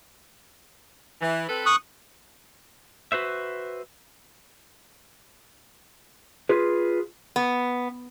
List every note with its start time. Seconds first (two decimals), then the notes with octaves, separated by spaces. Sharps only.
1.21 E3
1.49 C4 A4 B4
1.66 C#6 D#6 F#6
3.12 F#4 B4 C5 E5
6.49 F4 G#4 B4
7.36 B3